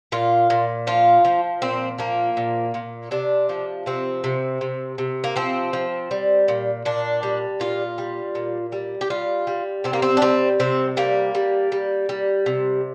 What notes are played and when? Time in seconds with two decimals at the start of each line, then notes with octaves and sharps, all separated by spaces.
0.12 A#2 F4
0.50 A#2
0.87 F3 F4
1.25 F3
1.62 A#2 C4
1.99 F3 A#3
2.37 A#2
2.74 A#2
3.11 C3 D4
3.49 F3
3.86 C3 C4
4.24 C3
4.61 C3
4.98 C3
5.24 A#3
5.36 F3 C4
5.73 F3
6.11 G3
6.48 A#2
6.85 A#2 D4
7.23 G3
7.60 A#2 F4
7.98 G3
8.35 A#2
8.72 G3
9.01 G4
9.10 G3 F4
9.47 G3
9.84 C3 C4
9.93 A#3
10.02 C4
10.17 D4
10.22 G3 C4
10.60 C3 C4
10.97 G3 A#3
11.35 G3
11.72 G3
12.09 G3
12.46 C3